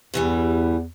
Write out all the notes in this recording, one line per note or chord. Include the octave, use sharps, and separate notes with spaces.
E2 G2 E3 G3